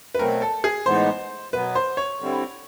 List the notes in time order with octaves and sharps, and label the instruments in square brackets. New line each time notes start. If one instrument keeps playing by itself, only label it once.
[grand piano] B4
[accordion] B2 F#3 A3 C4 [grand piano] A#4
[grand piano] A4
G#4
[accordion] A2 E3 G#3 B3 D#4 [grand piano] C5
[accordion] B2 F#3 B3 [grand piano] B4
[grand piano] C5
C#5
[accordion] D3 G3 C4 E4